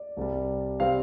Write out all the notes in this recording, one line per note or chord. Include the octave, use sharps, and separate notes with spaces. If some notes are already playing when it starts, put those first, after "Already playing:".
Already playing: D5
C2 C3 G3
C3 G3 C4 F5